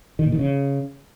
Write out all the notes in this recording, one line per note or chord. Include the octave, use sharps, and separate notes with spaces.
D#3
A#2
D#3
C#3